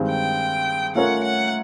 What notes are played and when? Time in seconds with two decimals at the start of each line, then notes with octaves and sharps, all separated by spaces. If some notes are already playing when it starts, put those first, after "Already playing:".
Already playing: G2 D#3 G#3 C4
0.08 G5
0.95 A3 C#4 F4 A#4 C#5 F#5
1.24 F#5